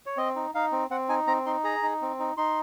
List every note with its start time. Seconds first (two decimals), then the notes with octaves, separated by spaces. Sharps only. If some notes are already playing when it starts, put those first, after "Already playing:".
0.06 C#5
0.17 C4 D#5
0.36 D#4
0.55 D#4 F5
0.72 C4
0.90 C4 F#5
1.09 D#4 G#5
1.27 C4 A#5
1.46 D#4 C6
1.64 G#4 A#5
1.83 D#4
2.02 C4
2.19 D#4
2.37 D#4 C6